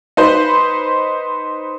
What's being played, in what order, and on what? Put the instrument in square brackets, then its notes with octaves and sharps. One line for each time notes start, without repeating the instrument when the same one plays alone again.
[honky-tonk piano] D#4 B4 C5